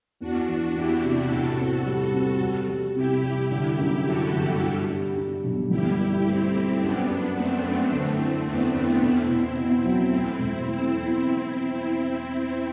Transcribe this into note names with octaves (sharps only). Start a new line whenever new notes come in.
E2 D4 F#4
E3
E2 E4 G4
C3
A2 F#4 A4
C4
G3
C4
G3
G3
C3 E4 G4
G3
D3
F#2
D3 F#4 A4
G1
D4
G3
D4
B1
G1 E4 G4
G2
A3 C4 E4
A3
F#2 B3 D4
F#2
A3 B3 C4
F#2
D3
E4
E2 B3 D4
E2
B2 C4 E4
B2
B2
F#3
A3 C4 E4
E1
A3 C4 E4
E2